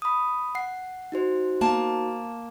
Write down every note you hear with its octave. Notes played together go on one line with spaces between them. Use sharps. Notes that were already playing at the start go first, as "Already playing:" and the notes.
B5 D#6
F#5 C7
D#4 F#4 C5
A#3 A5